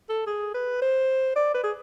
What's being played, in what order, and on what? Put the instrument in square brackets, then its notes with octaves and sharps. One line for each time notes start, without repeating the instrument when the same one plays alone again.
[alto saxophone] A4
G#4
B4
C5
D5
B4
G#4